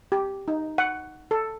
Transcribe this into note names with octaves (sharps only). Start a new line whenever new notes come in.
G4
D#4
F#5
A4